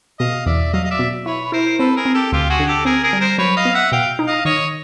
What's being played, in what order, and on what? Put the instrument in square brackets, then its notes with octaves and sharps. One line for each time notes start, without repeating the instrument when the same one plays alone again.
[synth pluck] B2 [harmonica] D#5 F5
[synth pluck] E2 [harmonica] D5 E5
[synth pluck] F#3 [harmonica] D#5 F5
[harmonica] D#5
D5 E5
[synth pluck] B2
[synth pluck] E4 [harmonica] B4 C#5
[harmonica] B4
[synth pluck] E4 [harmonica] A#4 C5
[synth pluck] C4 [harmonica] A4 B4
[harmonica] G#4 A#4
[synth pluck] C4
[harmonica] G4 A4
[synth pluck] D2 [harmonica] F4 G4
[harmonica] F#4 G#4
[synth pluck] D3
[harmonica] G4 A4
[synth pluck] C4 [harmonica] G#4 A#4
[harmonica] G#4 A#4
[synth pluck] G3
[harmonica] A#4 C5
[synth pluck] F#3 [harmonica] B4 C#5
[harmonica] D#5 F5
[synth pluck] B3
[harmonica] E5 F#5
[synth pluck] B2 [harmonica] F5 G5
[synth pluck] D#4
[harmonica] D#5 F5
[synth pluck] D#3 [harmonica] C#5 D#5